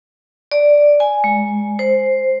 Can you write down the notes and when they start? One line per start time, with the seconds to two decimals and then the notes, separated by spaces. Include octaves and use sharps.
0.51 D5
1.00 G#5
1.24 G#3
1.79 C5